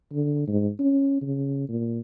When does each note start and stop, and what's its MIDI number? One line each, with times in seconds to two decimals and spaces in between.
0.12 0.44 50
0.47 0.69 44
0.79 1.19 61
1.22 1.66 49
1.68 1.99 46